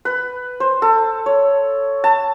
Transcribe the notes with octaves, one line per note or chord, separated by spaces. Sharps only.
B4
C5
A4
C#5
A5